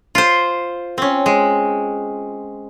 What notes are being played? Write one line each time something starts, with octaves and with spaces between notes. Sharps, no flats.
F4 C5
C4 C#4
G#3